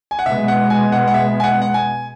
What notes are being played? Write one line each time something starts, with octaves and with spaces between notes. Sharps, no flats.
G#5
F#5
B2 G#3 B3 E5
F#5
G#5
F#5
F#5
E5
G#5
F#5
F#5
G#5